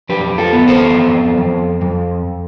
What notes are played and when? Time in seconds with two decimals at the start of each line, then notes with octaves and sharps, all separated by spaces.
0.09 F2 G4 B4
0.38 F4 A4
0.53 B3
0.67 A4 C5
0.96 F2
1.38 F2
1.82 F2